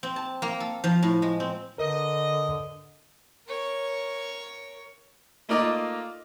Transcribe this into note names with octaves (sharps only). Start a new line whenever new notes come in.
C4
A5
A#3
A4
F3
A2
G#3
C4
D3 A#4 B4 D#5
A#4 C#5
A3 A#3 D#4 F4 D5 D#5